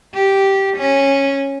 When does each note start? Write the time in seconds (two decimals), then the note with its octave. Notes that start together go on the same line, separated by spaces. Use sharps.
0.14 G4
0.77 C#4